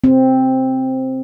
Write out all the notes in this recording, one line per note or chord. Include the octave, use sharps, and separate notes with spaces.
C4